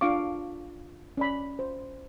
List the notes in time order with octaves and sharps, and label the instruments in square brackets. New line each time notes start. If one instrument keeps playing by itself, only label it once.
[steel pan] D4 F4 F5 C#6 D6
C#4 D5 B5
C5